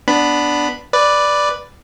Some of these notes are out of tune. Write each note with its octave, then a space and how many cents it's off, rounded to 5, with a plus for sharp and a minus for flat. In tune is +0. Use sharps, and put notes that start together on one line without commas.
B3 +0 D4 +0 B5 +0
B4 +0 D5 +0